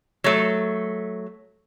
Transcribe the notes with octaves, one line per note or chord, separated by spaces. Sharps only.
F#3 A3